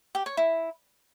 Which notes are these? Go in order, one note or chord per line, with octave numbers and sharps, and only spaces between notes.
G4
C#5
E4